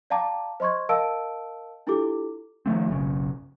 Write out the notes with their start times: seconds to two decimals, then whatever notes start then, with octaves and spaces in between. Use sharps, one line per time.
0.10 D5 F5 G5 A5 A#5 D6
0.60 C5 D#5 C6 C#6 G#6
0.89 A#4 D#5 F5 A5 E6 D7
1.87 D4 E4 F4 G4 A4 D6
2.66 D#3 F3 A3 C4
2.88 F#1 B1 C#3